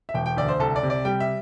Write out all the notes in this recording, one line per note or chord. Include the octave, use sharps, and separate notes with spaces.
E5
E1 G5
G5
D2 D5
C5
C2 A4
D5
C3
D5
G3 G5
E5